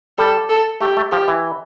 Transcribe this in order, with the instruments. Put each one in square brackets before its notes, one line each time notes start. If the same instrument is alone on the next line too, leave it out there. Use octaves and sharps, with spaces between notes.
[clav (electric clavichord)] G3 [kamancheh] A4
[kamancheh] A4
[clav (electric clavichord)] A3 [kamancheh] G4
[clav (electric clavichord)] A3
[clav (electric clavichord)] F3 [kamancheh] G4
[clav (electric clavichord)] E3